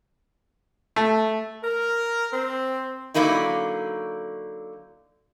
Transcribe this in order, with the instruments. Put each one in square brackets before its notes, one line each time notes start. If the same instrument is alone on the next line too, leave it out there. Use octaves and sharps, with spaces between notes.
[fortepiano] A3
[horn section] A#4
C4
[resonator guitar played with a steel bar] D3 F#3 A#3 D#4 E4